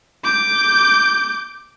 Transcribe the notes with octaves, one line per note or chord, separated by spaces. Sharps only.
D6 G6